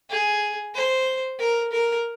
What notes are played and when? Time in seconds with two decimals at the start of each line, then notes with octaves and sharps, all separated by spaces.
0.10 G#4
0.74 C5
1.39 A#4
1.72 A#4